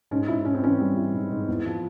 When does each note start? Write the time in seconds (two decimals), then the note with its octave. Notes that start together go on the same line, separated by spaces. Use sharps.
0.11 G#2 C#4
0.28 G#2 E4
0.45 G#2 C#4
0.54 C4
0.62 E3 C#4
0.80 G3
0.96 E3
1.14 G#2
1.31 G#2
1.48 E2
1.65 F3